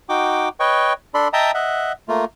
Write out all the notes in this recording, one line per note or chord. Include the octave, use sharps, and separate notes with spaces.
D#4 F#4 G5 D6
B4 C#5 D#5 G5 C#6
D4 A4 D5 B5 C6
D#5 E5 G5 A5 A#5 D#6
D#5 E5 F#5
A3 A#3 F4